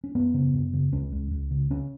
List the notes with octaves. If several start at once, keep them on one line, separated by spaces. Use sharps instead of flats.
C#4
F#2 B3
C#3
F#2
C#3
C#2 C#4
C#2
C#2
C#3
C#3 C#4